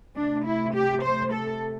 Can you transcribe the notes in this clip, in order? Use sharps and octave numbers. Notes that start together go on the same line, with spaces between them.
C3 A3 D4
E4
G4
C5
A4